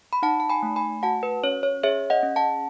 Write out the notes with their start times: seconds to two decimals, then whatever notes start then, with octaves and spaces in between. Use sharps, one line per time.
0.13 B5
0.22 D#4 F#5 A5
0.40 A5
0.50 G#5 B5
0.63 A3
0.76 G#5 B5
1.03 F#4 F#5 A5
1.23 B4
1.43 C#4 C#5
1.63 C#5
1.83 G#4 C#5 E5
2.10 D#5 F#5
2.23 C#4
2.36 F#5 A5